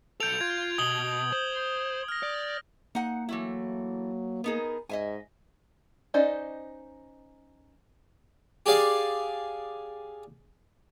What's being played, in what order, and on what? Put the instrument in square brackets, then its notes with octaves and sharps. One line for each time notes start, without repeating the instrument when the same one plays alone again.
[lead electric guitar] B1 A4 [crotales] G6 D7 F7
[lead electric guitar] F4 [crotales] G#6
[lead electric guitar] B2 [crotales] D#6 F#7 G7
[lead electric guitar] C5
[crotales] F6 A#6
[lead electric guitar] D5
[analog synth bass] A#3 [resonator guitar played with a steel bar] D#4 F#5
[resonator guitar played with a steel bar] E3 A3 E4 [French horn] F#3
[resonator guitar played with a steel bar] B3 D#4 G#4 [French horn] A#4
[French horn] G#2 [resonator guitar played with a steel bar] D#5 E5 G#5
[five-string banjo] C#4 D#4 C5 D5 D#5
[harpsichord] G4 G#4 D5 F5